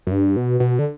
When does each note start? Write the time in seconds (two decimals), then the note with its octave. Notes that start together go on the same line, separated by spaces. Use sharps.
0.07 F#2
0.12 G2
0.36 B2
0.60 B2
0.79 D3